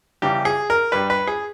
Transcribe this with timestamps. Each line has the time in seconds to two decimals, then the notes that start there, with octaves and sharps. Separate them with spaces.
0.22 E2 C#3 E3 G3 G4
0.45 G#4
0.70 A#4
0.92 G2 G3 B4
1.10 B4
1.27 G#4